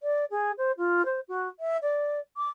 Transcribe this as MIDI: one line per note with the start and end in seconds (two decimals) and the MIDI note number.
0.02 0.24 74
0.30 0.51 68
0.57 0.71 72
0.77 1.04 65
1.05 1.20 72
1.28 1.48 66
1.59 1.77 76
1.82 2.19 74
2.37 2.49 86